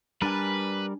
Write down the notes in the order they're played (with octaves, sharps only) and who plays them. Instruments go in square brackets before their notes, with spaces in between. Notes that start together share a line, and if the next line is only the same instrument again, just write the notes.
[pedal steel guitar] G3 A#4 D5 [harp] D4 G#5 [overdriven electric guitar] B4